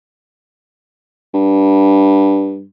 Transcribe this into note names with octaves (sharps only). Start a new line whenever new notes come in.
G2